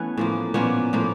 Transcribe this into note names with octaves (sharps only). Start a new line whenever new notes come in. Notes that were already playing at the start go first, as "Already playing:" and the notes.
Already playing: E3 A3 B3 C#4
A2 F3 A#3
A#2 F3 A#3 B3 C#4
A2 F3 A#3